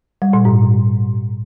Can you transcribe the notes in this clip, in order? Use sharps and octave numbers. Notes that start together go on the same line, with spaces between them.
G3
A#2
G#2